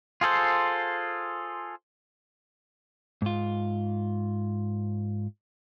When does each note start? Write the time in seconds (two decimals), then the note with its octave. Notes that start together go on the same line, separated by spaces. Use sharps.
0.21 F4 G#4 A4 C5
3.22 G#2 F4